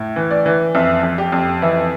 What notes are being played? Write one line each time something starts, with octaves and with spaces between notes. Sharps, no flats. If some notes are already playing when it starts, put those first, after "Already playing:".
Already playing: A2
E3
D5
E3
F2 E5
F2
G4
F2
E3 E4